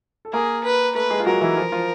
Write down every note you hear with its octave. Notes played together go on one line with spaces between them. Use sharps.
A4
A#3 G#4 A#4
B4
A3 A4 B4
G#3 G#4
F4
F#3 F#4 A#4
E3 E4
F3 F4
F3 F4